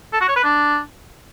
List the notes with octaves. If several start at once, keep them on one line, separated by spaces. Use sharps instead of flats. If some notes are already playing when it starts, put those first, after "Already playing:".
A4
F#4
C#5
B4
D4